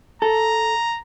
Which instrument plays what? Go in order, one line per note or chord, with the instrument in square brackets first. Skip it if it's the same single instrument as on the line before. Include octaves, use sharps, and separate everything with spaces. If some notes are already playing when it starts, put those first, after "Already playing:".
[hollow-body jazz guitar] A4 [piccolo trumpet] A#5